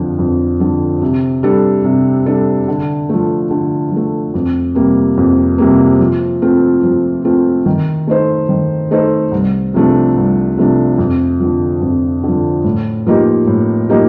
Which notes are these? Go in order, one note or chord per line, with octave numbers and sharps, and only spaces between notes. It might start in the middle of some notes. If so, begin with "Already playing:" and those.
Already playing: F2 D3 F3
F2
D3 F3
C3
G3 D4 A4
C3
G3 D4 A4
D3
F3 A3
D3
F3 A3
F2
C3 G3 A#3
F2
C3 G3 A#3
F3
A3 C4 F4
F3
A3 C4 F4
D#3
A3 D#4 A4 C5
D#3
A3 D#4 A4 C5
C2
C3 F3 A3 D4
C2
C3 F3 A3 D4
F2
D3 F3
F2
D3 F3
A2
F3 A#3 D#4 G4
A2
F3 A#3 D#4 G4